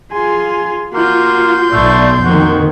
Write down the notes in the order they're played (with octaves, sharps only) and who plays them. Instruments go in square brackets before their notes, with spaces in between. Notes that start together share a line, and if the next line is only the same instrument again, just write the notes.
[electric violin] F4 C6 [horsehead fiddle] G#4 G#5
[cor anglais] A#3 [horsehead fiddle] F4 F#4 [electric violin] C6 G6
[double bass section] B1 B2 [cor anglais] A3 [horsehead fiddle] D5
[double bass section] F2 D#3 [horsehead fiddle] A#3 C4 [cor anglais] F#4